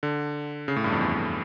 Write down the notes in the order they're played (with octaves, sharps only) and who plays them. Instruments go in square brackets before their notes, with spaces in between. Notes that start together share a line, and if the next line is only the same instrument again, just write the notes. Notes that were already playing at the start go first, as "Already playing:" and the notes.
[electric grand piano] D3
C#3
A2
G2
F2
E2